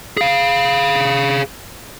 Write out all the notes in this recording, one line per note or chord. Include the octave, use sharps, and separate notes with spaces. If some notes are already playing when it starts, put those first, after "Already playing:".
G#4 F5